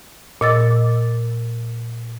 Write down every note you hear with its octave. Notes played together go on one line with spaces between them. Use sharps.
A#2 D#5 D6 E6 A6